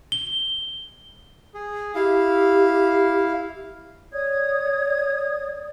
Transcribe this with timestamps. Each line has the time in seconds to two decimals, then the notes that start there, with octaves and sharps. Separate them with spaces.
0.12 G7
1.54 G#4
1.95 E4 G4 F5
4.12 C#5 D5 D#6 G#6